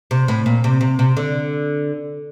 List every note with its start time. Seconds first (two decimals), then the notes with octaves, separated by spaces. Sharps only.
0.11 C3
0.28 A2
0.46 A#2
0.64 C3
0.81 C3
0.99 C3
1.17 D3